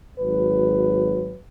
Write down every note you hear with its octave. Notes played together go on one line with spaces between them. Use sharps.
G#1 F#3 B4